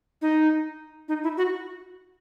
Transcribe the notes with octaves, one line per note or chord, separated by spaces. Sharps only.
D#4
D#4
E4
F#4